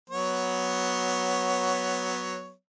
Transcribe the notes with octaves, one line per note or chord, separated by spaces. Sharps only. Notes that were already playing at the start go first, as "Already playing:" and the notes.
F#3 B3 C#5